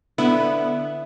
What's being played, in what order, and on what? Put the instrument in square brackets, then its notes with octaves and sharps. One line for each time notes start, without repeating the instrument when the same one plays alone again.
[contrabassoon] D3 [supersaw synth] B3 [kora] E4